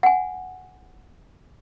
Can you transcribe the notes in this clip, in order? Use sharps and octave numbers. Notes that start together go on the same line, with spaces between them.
F#5 G#5